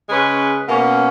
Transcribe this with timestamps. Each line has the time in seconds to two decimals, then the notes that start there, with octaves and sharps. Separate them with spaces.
0.09 C#3 G#3 C#4 G#4 B4
0.69 B2 A#3 C#4